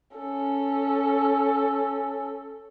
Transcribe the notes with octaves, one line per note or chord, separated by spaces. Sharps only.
C#4 A4